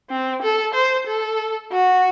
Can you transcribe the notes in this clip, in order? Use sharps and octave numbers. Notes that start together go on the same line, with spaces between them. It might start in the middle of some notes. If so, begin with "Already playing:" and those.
C4
A4
C5
A4
F#4